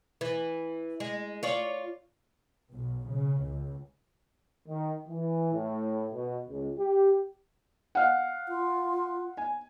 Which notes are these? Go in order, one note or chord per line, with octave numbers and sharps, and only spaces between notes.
E3
G#3
F4 C#5 D5
B1
C#3
C#2
D#3
E3
A2
B2
C#2
G4
F5 F#5
F4
G#5